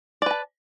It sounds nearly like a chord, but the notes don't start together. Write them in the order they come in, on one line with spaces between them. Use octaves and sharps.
D5 B4 A5